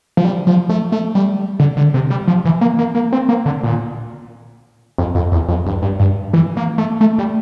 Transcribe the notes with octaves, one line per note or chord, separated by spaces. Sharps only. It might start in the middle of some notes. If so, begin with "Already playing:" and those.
F3
G3
F3
A3
A3
G3
D3
D3
C3
G3
F3
E3
A#3
A#3
A#3
C4
A#3
D3
A#2
F2
F2
E2
F2
G2
G2
G2
E3
A#3
A3
A3
G3